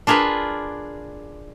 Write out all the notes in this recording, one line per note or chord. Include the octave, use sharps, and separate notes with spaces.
D4 F4 G#4 A#4 B4